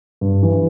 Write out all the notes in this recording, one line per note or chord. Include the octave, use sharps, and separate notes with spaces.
G2
E3